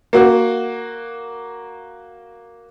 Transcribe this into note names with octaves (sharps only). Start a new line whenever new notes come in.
A#3 F#4